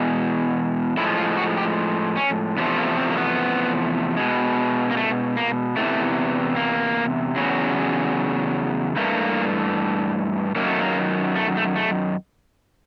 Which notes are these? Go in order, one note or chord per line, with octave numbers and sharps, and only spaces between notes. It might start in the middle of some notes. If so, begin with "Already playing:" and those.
Already playing: E2 B2 G#3
A2 F3 G#3 E4
F4
F#4
G4
C#4
E2 C3 F3 A3 B3
A#3
C4
A#3
B3
B2 G#3
A#3
A3
A#3
E2 C3 E3 A3
A#3
E2 C#3 F#3
G2 E3 A3 A#3
F#2 D#3 F#3 A#3
A3
A#3
A3
A3
A3